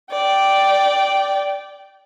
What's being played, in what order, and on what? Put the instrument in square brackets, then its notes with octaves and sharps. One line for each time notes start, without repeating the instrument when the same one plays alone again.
[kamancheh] D5 G5